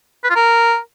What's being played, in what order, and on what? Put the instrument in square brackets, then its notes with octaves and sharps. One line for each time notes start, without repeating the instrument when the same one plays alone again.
[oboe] B4
F4
A#4